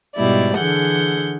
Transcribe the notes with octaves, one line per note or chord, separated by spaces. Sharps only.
G#2 B2 G3 E4 D5
D3 E3 G#4 F#5 G6